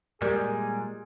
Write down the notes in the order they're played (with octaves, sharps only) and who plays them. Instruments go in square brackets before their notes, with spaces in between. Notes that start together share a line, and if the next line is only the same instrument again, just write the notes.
[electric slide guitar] A#2 G3 G#3 [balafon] G4 A#4 D5 [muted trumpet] G#4